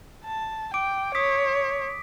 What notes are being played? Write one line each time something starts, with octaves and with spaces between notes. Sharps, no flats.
A5
G5 D6 D7
C#5 D#6 B6